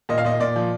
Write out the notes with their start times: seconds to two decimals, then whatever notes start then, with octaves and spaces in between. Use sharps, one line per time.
0.09 A#2 D#5
0.18 F5
0.25 A#2 D#5
0.40 A#2 D5
0.56 F3